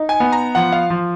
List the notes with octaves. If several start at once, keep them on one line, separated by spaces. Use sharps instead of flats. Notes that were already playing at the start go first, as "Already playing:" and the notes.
Already playing: D#4
G#5
B3
A#5
F3 F#5
F5
F3